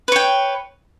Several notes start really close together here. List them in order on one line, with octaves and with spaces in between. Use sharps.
B4 C#5 G5